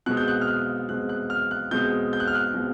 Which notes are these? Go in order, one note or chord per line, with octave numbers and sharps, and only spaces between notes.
B2 G#3 C4 F#6
G6
F#6
F6
F#6
B2 G#3 C4 F#6
F#6
F6
F#6
B2 G#3 C4 G6
G6
F#6
F6
F#6
B2 G#3 C4